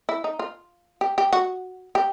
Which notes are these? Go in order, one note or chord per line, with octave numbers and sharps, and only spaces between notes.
E4
D#4
F4
G4
G4
F#4
G4